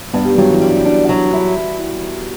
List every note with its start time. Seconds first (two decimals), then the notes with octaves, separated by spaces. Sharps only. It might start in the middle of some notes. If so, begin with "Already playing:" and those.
0.13 G2 B3
0.25 G3
0.38 G2 F#3
0.50 E3
0.62 G3
0.85 D4
1.09 F#3
1.33 E4